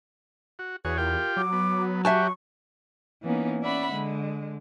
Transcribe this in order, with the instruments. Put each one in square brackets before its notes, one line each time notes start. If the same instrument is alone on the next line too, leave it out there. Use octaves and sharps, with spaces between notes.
[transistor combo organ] F#4
[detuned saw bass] E2 [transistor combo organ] F#4 G#4 C#5 [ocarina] B4
[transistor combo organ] F4 G4 G5 [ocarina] A#4
[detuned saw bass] F#3 [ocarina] D6
[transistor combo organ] B3
[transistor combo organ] F#4 G4 [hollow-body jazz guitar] E5 G#5 A5 [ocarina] C#6
[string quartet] E3 A#3 B3 C#4 D#4
C#4 D5 E5 F#5 B5
D3 G#3